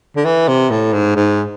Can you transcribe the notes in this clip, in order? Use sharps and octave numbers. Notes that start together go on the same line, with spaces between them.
D3
E3
C3
A2
G#2
G#2